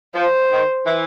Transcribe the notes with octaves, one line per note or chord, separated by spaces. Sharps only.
F3 C5
D#3
E3